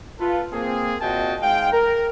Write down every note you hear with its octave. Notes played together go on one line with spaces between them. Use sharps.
F4 A4 B4
A#3 C4 G#4
A#2 C4 F#4 D#5 G5 A5
G#2 G#3 F5 G5
A#4